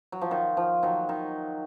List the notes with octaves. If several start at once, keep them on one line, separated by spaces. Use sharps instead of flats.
F#3
F3
D#3
F3
D#3 F#3
D#3